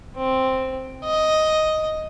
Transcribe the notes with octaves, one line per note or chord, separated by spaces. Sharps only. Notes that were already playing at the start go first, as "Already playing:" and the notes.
C4
D#5